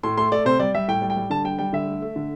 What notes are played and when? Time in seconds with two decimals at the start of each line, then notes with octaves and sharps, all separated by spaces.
0.03 A2 C6
0.17 A3 C6
0.32 A3 D5
0.45 C3 C5
0.59 G3 D5
0.75 G3 E5
0.88 A2 G5
1.02 G3
1.10 G5
1.17 G3
1.30 D3 A5
1.44 G3 G5
1.58 G3 G5
1.73 D3 E5
1.87 A3
2.02 A3
2.16 D3